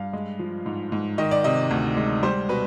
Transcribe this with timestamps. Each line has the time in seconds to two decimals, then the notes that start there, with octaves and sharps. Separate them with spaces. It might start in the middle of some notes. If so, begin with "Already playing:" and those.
Already playing: G2 F5
0.13 G#3
0.39 F3
0.66 G#2
0.92 G#2
1.18 D#3 D#5
1.31 D5
1.44 C3 D#5
1.71 D2
1.97 G#3
2.23 G3 C5
2.49 B2 B4